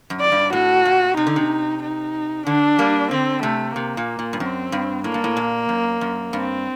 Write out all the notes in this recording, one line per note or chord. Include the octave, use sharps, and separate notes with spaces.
F#2
D5
G2
A2 F#4
A#2
C3 D#4
D3
C3
D#4
D3 D4
G3 A#3
D3 C4
C3 A3
C3 A#3
A#2
A#2
G2
F#2 C4
G2
A2 A#3
G2
A2
A#2
F#2
F#2
G2 C4